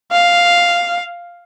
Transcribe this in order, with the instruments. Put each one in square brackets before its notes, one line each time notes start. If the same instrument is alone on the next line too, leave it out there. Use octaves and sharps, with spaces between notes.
[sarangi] F5